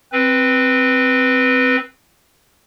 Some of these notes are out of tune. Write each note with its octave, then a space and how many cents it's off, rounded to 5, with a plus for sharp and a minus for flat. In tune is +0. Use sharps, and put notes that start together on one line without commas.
C4 +0 B4 +0